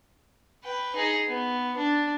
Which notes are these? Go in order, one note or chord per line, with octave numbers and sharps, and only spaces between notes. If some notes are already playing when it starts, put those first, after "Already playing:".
B4 G5
D#4 G#4
B3
D4